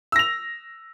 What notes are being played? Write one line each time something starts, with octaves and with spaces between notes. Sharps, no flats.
E6 A#6 F7